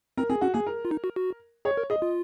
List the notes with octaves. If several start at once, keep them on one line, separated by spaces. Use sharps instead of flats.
C4 A#4
C4 G#4
C#4 F#4
A#3 G#4
A#4
F4
D#4
F#4
F#4
G#4 C#5
A#4
G#4 D#5
F4